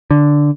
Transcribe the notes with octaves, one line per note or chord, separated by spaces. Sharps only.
D3